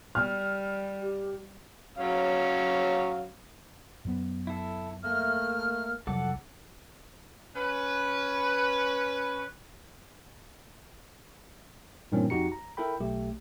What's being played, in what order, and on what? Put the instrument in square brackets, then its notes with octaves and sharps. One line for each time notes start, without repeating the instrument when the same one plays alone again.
[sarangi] G3 [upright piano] F6
[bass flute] G4
[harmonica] F#3 C#4 F5
[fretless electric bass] F#2 F#3 B3
[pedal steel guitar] E4 A4
[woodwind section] A3 F6 [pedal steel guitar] A#3
[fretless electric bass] C2 F2 F#3 [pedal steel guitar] A4 F#5 D6
[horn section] C#4 B4
[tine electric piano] G2 A#2 D#3 E3 C4 C#4
F2 D#4 F#4 G4 A#5 C#7
A#5
E4 A4 A#4 G5 B5
B1 A3 G4